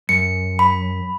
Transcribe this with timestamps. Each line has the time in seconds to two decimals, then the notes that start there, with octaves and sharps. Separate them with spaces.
0.09 F#2 C#7
0.59 B5